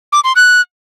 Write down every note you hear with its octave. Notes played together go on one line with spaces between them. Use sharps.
D6
C6
F#6